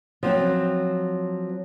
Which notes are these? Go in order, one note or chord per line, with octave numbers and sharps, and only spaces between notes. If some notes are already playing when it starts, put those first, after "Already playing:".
F3 F#3 C4